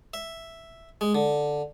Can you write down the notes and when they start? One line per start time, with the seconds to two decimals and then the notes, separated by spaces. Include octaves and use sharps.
0.14 E5
1.01 G#3
1.15 D3